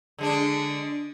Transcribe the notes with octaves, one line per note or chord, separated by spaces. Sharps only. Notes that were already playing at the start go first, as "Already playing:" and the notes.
D3 G#3 D4